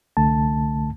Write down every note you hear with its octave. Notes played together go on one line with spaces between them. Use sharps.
C2 D3 A3 A5